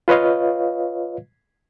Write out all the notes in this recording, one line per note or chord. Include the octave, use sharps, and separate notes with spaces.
F4 B4 C#5 D#5 F5